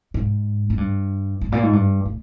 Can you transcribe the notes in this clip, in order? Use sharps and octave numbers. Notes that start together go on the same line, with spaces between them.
G#2
G#2
G2
G#2
A#2
G#2
G2
A2